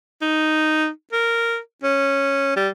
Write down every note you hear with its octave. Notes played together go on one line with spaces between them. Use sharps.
D#4
A#4
C#4
G3